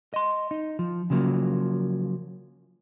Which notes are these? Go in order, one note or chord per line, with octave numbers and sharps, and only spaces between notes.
D#5 C6
D#4
F3
C#3 F3 F#3 A#3